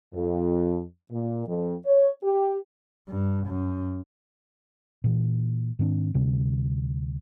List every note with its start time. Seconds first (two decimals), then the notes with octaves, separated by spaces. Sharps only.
0.13 F2
1.10 A#2
1.47 F2
1.86 C#5
2.23 G4
3.08 G2
3.46 F#2
5.04 A#2 E3
5.79 G#2 D#3 C4 D4
6.14 D2 C3 G3